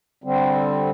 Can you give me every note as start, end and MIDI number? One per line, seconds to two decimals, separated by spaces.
0.24 0.91 50
0.24 0.91 55
0.24 0.91 60